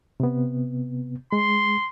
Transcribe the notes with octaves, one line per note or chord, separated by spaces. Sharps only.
C3 B3
G#3 C6